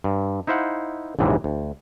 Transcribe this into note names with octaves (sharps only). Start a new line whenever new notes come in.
G2
D#4 E4 C5 F5 F#5
A#1 D#2 G#2 C3 E3
D2